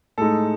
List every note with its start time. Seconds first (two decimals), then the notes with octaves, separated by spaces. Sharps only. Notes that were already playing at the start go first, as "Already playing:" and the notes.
0.18 A2 G#3 D#4 A4